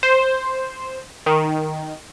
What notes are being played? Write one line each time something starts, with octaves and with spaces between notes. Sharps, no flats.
C5
D#3